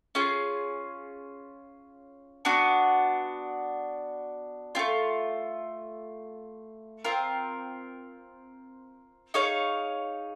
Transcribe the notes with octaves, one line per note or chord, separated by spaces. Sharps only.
C#4 F4 G#4
B3 D4 F#4
A3 C4 F4
C4 F4 A#4
D#4 G#4 C#5 F5